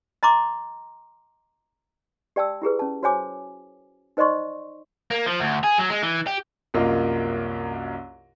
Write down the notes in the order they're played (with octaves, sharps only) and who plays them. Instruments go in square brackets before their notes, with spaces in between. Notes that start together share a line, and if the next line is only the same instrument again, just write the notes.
[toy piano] D#5 A#5 C6 D6
G4 D5 G5 A5 E6
E4 G4 G#4 B4
C#4 A5
F#4 C5 C#5 G#5 D6
D#4 C5 D5 D#5 C6 C#6
[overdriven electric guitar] A#3
F3
D2
G#4
F#3
G#3
E3
G4
[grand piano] C2 F#2 A#3 F4 D#5